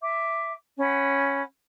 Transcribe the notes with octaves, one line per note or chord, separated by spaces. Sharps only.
E5 D6
C#4 F#5 B5